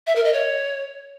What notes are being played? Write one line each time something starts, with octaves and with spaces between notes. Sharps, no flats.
E5
A#4
D#5
C#5